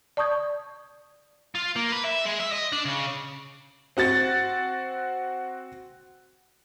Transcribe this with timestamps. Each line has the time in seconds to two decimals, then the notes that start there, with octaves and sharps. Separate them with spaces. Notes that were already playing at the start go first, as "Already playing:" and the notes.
0.17 D5 A5 C#6 D#6 G6 G#6
1.55 F4
1.76 A#3
1.92 B4
2.05 E5
2.25 G#3
2.39 E5
2.52 D#5
2.72 D4
2.85 C#3
3.97 C4 F#4 F#5 A6